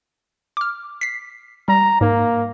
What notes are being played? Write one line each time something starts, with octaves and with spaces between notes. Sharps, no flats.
D6 F6
B6 C7
G3 A#5
G#2 A#3